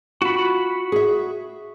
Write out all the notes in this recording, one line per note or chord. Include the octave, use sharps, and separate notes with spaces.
F4 F#4 B5
G#4 E5